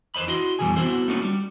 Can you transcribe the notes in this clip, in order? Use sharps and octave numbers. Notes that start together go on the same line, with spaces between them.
E2 B4 C5 D#5 B5
E4 F#4 D#5 C6
F2 B2 E3 G3 G#4 G#5
B3 C4 E4 F#4 A4 C5
A3 A#3 C#4 D#4 F4 F#4
G3